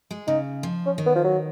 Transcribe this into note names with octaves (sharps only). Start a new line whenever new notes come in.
G#3
C#3 D#4
F3
C#4
D#3
B3
F3
F#3